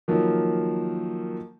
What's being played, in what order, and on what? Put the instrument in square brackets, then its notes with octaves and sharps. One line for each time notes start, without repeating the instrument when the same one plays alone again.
[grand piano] D#3 F3 F#3 A#3